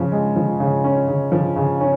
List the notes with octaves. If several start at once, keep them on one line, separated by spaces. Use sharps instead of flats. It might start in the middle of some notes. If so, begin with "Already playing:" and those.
Already playing: C#3 F3 C#4
G#3
F3
C#3
C#4
C#3
F3
C#3
C#4